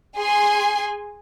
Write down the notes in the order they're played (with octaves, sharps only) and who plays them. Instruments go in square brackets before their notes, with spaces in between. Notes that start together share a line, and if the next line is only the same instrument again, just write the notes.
[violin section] G#4 G#5 C6